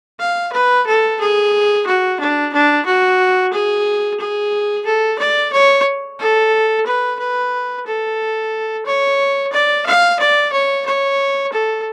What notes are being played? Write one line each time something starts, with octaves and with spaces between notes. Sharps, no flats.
F5
B4
A4
G#4
F#4
D4
D4
F#4
G#4
G#4
A4
D5
C#5
A4
B4
B4
A4
C#5
D5
F5
D5
C#5
C#5
A4